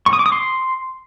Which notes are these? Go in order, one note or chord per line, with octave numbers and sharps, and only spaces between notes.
C#6
D#6
D6
D#6
C6